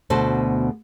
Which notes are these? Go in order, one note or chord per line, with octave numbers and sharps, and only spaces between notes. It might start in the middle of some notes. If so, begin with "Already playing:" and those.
D2 B2 A4 C5